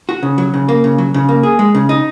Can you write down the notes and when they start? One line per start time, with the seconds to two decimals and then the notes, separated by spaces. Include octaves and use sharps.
0.09 F#4
0.23 C#3
0.38 F#3
0.54 C#3
0.69 A#3
0.84 C#3
0.98 F#3
1.14 C#3
1.29 A#3
1.43 G#4
1.59 G#3
1.75 C#3
1.89 D#4